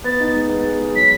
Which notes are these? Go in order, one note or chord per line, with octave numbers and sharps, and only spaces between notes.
B3 A6
D#4
G#3
B3
G#4
G#3
F#3 B6